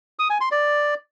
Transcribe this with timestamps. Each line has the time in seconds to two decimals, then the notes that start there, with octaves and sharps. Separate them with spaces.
0.19 D#6
0.30 G#5
0.41 C6
0.52 D5